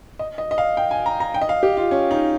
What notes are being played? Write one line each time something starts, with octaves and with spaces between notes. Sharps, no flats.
D#5
D#5
D#5
F5
G5
G#5
A#5
A#5
G5
D#5
F5
G4
F4
C#4
D#4